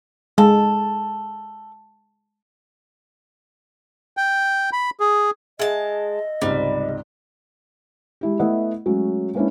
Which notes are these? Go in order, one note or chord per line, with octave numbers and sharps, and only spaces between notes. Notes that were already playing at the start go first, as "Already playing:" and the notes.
G#3 A4
G5
B5
G#4
G#3 D#5 E5 A5
C#2 G#2 C3 G3
G#3 E4 G4
A3 B3 E4 D#5 E5 F#5
F#3 G#3 A3 C#4
G#3 A#3 B3 C#4 D4 E4